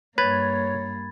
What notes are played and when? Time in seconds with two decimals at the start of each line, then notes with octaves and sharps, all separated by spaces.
0.18 G2 A#3 B4 C#5 B5 G#6 A6